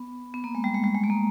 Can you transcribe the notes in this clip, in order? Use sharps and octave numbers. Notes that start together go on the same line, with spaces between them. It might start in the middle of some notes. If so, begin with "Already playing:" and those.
Already playing: B3
B3
A#3
G#3
G3
G#3
G3
G#3
A3
A#3